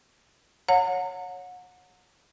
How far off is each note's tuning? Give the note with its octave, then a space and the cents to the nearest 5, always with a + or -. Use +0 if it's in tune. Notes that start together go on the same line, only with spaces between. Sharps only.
C#5 +0 F#5 -30 A#5 -35